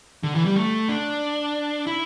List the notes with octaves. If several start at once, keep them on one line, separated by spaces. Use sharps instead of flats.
D3
E3
G3
A3
D4
E4